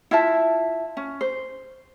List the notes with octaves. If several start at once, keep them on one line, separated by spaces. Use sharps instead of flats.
E4 F4 E5 A5
C#4
C5